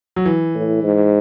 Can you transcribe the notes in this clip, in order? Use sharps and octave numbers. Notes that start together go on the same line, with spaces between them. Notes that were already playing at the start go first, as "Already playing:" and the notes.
F#3
E3
A2
G#2